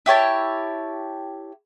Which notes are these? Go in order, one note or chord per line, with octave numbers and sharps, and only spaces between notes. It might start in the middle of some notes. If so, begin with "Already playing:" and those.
E4 G4 C#5 A5